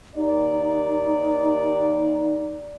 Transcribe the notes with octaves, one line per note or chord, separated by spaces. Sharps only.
D#2 D#4 D5